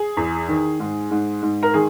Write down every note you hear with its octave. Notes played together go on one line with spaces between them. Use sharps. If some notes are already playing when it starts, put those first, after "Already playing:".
Already playing: G#4
E2
D#3
G#2
G#2
G#2
A#4
D#3 G#4